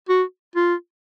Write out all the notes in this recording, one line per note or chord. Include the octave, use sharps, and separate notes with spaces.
F#4
F4